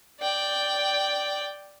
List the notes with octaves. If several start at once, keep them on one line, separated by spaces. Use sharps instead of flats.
D5 G5